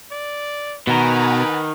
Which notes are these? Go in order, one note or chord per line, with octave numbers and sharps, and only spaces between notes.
D5
B2 D#3 B4 F#5 G#5 A#5